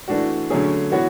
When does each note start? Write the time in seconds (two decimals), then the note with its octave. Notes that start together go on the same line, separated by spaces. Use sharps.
0.08 E3 A3 D4 F#4
0.50 D3 F#3 A3 C#4 G#4
0.92 E3 B3 F#4 C#5